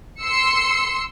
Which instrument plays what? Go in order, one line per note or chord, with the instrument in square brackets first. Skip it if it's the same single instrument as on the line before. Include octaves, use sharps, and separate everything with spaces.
[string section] C6 E6 C#7